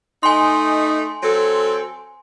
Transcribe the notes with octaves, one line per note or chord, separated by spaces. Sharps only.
A3 D#4 G#5 C6
F#3 C4 A4